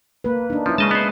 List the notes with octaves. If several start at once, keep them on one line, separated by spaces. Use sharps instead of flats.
A#3 B4
D4 D#4
F3 C#4 E4
C#3 G#3 D#5 A5
B3 C5